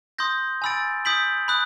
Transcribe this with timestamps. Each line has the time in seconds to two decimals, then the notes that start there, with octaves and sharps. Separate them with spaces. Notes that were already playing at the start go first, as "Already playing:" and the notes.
0.18 C6 D#6 G6 A#6
0.62 G#5 B5 E6 A6 D7
1.05 D#6 G6 B6 D7 F#7
1.48 B5 D#6 F#6